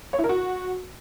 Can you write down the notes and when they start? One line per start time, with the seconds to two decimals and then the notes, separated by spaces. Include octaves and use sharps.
0.13 C#5
0.19 E4
0.24 A#4
0.29 F#4